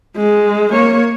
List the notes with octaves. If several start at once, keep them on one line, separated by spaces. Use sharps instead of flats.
G#3
A#3 C#5